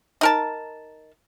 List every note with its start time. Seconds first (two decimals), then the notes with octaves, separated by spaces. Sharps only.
0.21 D#4 A#4 A5